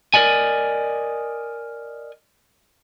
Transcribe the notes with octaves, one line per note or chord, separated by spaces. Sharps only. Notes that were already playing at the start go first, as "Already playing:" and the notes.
A#4 C5 D5 D#5 G#5